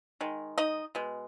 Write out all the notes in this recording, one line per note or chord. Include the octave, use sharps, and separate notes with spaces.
D#3 G#3
D#4 D#5
B2 G#3